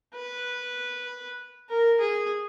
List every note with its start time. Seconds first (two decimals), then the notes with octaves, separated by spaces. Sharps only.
0.16 B4
1.69 A#4
2.00 G#4